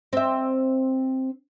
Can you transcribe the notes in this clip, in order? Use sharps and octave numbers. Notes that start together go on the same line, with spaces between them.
C4 E5